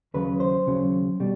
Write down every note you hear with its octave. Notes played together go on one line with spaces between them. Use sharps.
D#2 C#3 F#3 B4
C5
D#2 C#3 F#3
B2 G3